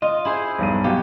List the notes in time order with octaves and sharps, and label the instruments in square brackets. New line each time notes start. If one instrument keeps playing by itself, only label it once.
[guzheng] F4 [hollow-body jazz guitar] D#5
[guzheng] E4 G#4 C5
[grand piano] B1 G2 D#7
[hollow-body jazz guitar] B2 F#3 [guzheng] G4 [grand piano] F5